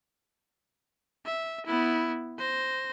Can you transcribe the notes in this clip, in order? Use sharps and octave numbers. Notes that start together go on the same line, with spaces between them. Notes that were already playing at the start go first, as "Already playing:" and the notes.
E5
B3 E4
C5 A#6